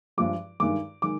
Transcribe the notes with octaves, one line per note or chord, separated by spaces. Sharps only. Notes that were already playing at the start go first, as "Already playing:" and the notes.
G2 F3 G#3 D6
G2 D#3 G#3 D6
D#3 G#3 D6